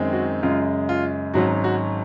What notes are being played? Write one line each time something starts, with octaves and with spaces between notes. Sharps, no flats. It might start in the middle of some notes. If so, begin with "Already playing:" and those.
Already playing: F#2 D#3 G#3 C4
F#4
F#2 C#3 G#3 F4
F4
G#1 G#2 F#3 C#4 F#4
F#4